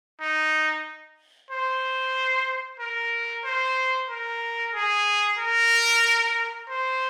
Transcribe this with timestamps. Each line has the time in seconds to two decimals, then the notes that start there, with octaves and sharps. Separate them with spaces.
0.21 D#4
1.51 C5
2.79 A#4
3.45 C5
4.10 A#4
4.74 G#4
5.39 A#4
6.69 C5